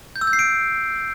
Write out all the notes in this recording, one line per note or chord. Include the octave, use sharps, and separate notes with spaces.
G6
E6
G6
C7
D7